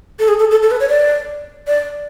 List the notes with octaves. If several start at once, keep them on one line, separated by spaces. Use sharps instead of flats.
A4
G#4
A4
A4
A4
B4
C#5
D5
D5